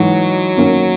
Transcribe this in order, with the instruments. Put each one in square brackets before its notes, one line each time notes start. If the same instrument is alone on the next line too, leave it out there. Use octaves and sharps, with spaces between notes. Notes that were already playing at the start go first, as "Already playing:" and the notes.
Already playing: [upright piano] G#2 E3 G#3 D#4 F#4 [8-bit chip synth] F#3
[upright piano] F#2 D#3 A#3 C#4